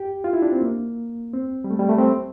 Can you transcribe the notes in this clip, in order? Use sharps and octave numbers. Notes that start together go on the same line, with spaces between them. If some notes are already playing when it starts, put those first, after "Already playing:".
Already playing: G4
F4
E4
D4
C4
A#3
C4
G3
A3
G3
A3
C4